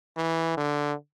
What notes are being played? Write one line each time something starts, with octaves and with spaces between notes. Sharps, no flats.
E3
D3